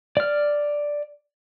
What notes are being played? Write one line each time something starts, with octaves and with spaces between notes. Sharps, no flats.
D5 F6